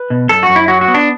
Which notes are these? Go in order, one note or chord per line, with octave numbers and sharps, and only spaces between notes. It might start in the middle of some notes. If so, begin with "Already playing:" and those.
Already playing: B4
B2
F#2 A4
F#4
F#2
E4
F#3 F#4
F#4
B3
D4